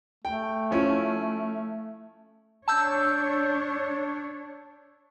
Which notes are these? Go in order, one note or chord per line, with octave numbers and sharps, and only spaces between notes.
A3 G5
F3 C#4 E4
D4 C#5 A5 E6 G6